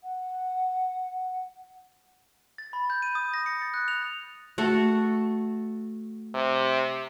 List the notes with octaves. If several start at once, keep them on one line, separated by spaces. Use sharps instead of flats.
F#5
A6
B5
G6
D#7
D#6
A#6
C#7
A6
F#6
F7
A3 F#4 A4
C3